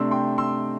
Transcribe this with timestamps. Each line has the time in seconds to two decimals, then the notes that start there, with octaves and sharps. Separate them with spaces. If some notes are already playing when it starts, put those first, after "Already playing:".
Already playing: C3 A3 D4 C6 E6
0.11 G5 C6
0.38 C6 E6